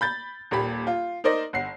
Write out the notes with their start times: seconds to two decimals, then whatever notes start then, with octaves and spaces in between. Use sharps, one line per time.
0.01 B5 G6 A6
0.51 D#1 A#2 G4 B5
0.87 F4
1.24 D#4 A#4 C5 D5 D#5
1.53 G1 F#5 C7